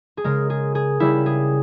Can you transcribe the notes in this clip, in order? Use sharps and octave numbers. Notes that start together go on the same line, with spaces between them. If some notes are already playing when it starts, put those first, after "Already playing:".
G#4
C#3 G#3 A#4
G#4
G#4
C#3 G3 E4
G#4